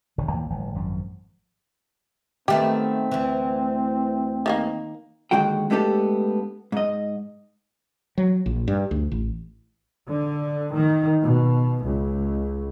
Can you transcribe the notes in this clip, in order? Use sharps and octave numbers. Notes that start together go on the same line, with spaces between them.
E1 D3 D#3
D#2 E3 F3 A#3
G1 A2 F3
G#1 F#2 F3
D#3 A3 B3 C4 G4
D2 E3
D#3 A3 A#3
D#2 G#2 D3 G#3 F#4 G5
G#3 A3 B3 D4 G4 A4
G#2 D#5
F#3
A#1
G2
D2
A1
D3
D#3
B2
C#2